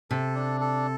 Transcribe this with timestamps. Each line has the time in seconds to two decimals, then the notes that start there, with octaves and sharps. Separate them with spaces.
0.10 C3 A4
0.35 D4
0.61 A4